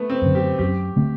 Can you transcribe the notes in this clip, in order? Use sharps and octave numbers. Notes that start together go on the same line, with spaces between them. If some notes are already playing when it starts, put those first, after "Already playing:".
Already playing: A3 B3
C4
F#2 D3
G4
F#2 G4
D3 A3 C4